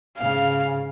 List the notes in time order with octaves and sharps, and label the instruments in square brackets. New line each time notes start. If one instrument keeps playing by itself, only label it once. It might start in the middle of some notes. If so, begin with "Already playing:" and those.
[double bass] G#2 C#3 [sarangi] F5